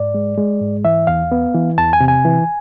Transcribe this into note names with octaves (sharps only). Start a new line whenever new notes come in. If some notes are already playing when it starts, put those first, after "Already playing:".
Already playing: G#2 D5
G#3
G#3
G#2
E3 E5
E2 F5
B3
E3
E2 A5
G#5
C3
G#5
E3